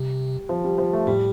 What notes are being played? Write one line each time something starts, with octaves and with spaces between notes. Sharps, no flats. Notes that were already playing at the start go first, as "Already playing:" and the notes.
Already playing: C3 G3
F3
G3
F3
A3
A2 G3